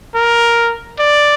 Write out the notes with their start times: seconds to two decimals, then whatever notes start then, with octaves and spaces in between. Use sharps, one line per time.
0.15 A#4
1.00 D5